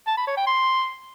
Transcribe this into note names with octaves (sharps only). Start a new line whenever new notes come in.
A5
B5
C#5
G5
C6